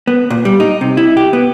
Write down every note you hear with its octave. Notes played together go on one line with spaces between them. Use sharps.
B3
A#2
G3
D#4
C3
E4
G4
B3